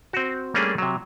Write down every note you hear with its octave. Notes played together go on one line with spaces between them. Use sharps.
C4 F#4
G3 A3 A#3 C#4 D4 G#4
C3 F#3